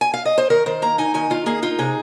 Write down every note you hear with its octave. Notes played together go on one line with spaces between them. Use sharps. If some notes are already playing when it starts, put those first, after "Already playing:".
G#5
F5
D#5
C5
D#3 A#4
D#3 C5
A#3 A#5
D#4 G#5
D#3 G#5
D#3 F4
A#3 G#4
D#4 F4
C3 G#4